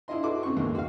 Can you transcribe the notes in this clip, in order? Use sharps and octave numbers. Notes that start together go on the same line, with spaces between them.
D4 E4 F4 D#5 C6
F#4 A4 B4 C6 D6
C#3 C4 C#6
D#2 G#2 A#3
F#4 F5